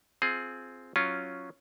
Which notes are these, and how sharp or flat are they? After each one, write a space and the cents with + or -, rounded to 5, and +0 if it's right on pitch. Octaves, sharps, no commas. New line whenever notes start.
C4 +0 F4 +0 G#4 +15
F#3 +0 C#4 +0 F4 -5